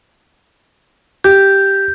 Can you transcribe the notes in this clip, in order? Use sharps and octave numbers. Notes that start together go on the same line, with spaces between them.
G4 G6